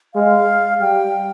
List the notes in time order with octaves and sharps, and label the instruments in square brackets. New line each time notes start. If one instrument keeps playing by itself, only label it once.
[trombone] G#3 [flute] F5
[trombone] G3 [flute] G5